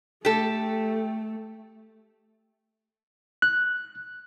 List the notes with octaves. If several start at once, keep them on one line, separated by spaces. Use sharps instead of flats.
A3 G4 A4
F#6